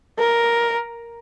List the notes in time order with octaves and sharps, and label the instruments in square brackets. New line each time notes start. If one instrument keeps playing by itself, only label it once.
[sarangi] A#4